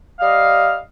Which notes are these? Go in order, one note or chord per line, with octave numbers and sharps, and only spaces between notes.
G3 D#5 F5